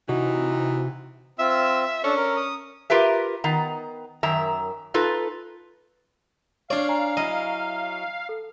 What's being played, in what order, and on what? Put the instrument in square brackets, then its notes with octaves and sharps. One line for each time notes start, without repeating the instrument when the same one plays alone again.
[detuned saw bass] C3 [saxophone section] E3 D#4 [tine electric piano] F#4
[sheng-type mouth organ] C4 F4 E6 [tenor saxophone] E5
[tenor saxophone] C#4 [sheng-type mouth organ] D4 A4 C#6
[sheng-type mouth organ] A#4
D#6
[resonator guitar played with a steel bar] F4 G4 A#4 B4 E5
D#3 B3 A#5
F#2 D#3 E5 A#5
D#4 F4 A4 B4
[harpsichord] D4 D5 [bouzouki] C#5 [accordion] F5
[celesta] G#5 A#5
[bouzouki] F#3 E4 [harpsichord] D#5
[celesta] A4